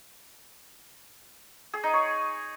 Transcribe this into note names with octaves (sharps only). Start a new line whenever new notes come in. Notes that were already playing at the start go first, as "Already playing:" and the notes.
G#4
D#4
C#5